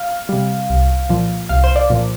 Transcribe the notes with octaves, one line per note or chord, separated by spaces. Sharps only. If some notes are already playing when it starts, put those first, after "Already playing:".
Already playing: F5
C3 G3
C2
A#2 F3
C2 F5
C5
D5
A#2 F3